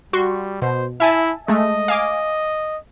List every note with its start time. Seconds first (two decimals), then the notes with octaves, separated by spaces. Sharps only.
0.13 G3 F#4 C6 C#6
0.62 B2 C5
1.00 E4 E5 G#5 A5
1.48 G#3 A3 D#5
1.88 F5 G#5 D6